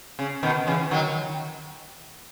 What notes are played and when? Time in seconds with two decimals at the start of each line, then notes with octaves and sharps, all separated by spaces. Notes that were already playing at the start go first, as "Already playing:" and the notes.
0.19 C#3
0.43 B2 D#3
0.67 C#3 E3
0.91 D#3 F#3